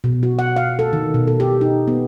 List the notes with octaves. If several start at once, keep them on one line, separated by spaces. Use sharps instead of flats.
B2
F#4
F#5
F5
A4
D#3
B2
A4
G4
D#4
B3